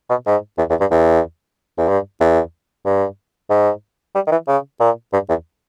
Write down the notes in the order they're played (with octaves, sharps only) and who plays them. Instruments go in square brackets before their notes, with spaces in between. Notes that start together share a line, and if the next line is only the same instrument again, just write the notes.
[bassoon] B2
G#2
E2
E2
G2
E2
E2
G2
E2
G2
G#2
G3
D#3
E3
C#3
A#2
G2
E2